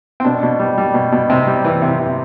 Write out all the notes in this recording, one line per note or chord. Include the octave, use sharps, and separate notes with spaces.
C4
B2 D4
B2
G3
G3
B2
B2
C3 C4
G3
E3
C3
C3